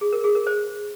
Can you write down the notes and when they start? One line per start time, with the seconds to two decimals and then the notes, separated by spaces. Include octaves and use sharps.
0.01 G#4
0.13 A#4
0.24 G#4
0.35 A#4
0.47 C5